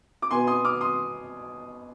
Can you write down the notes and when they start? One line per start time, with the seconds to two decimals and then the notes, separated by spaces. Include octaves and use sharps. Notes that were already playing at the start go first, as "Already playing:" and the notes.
0.22 D6
0.31 B2 B3 G#5 C6
0.47 C6 D#6
0.65 D6 F6
0.81 C6 D#6